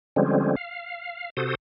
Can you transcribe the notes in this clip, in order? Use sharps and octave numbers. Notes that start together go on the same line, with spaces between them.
D3 F3 G3 G#3 C4 C#4
F5
C3 F#4 A4 C5 D#6